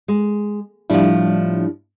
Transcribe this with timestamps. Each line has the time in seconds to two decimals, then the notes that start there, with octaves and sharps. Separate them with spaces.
0.08 G#3
0.90 A2 F3 G3 D4 E4